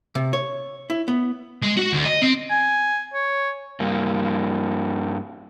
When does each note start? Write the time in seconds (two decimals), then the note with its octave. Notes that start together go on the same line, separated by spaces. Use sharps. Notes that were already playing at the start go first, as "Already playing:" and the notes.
0.15 C3
0.33 C#5
0.90 E4
1.08 B3
1.62 G#3
1.77 F#4
1.93 D2
2.05 D#5
2.22 C4
2.50 G#5
3.14 C#5
3.80 G2 A#3